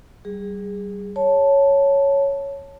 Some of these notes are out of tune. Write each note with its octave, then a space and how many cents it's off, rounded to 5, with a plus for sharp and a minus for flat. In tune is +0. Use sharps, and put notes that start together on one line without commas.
G3 -25 G#4 -20
C#5 +0 A5 +0